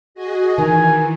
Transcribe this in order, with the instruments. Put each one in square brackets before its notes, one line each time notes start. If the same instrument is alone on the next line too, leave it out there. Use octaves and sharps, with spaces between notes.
[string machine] F#4 G#4 D#5
[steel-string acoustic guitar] D#3 [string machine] E3 [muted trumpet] G#5